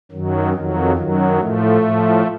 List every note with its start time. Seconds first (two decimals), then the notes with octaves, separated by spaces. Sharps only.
0.12 F#2 D#3 F#3
0.54 F2 D#3 F#3
0.96 F#2 D#3 F#3
1.38 A2 F3 A3
1.81 A2 F3